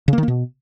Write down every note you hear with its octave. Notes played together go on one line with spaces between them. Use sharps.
C#3
A#3
D#3
A#3
B2